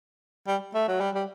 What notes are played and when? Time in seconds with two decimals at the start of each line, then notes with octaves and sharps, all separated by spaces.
0.47 G3
0.74 A3
0.88 F#3
1.00 G3
1.15 G3